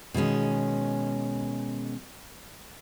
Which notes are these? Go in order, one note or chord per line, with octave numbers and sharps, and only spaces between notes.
B2 D#3 G#3 C#4